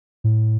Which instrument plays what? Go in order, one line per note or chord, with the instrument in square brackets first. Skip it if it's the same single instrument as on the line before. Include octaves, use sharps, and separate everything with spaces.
[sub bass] A2